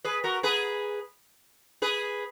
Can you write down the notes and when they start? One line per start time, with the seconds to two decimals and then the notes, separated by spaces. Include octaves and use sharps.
0.04 G#4 B4
0.24 F#4 A#4
0.43 G#4 B4
1.82 G#4 B4